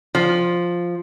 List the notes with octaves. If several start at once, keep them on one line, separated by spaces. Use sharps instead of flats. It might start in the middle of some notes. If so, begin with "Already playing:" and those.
F3